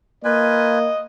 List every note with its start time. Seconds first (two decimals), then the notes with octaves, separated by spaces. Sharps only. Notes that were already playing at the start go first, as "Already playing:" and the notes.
0.24 A#3 F4 B4 D#5 G#5